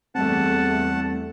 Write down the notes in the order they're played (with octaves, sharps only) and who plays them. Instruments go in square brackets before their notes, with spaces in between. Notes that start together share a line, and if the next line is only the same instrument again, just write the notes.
[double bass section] E2 A3 [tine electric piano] G3 C4 [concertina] F#5 A5